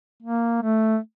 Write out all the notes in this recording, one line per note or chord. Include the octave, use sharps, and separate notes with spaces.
A#3
A3